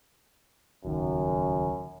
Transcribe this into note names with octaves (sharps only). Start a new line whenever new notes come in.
D#1 C#2 F#2 D#3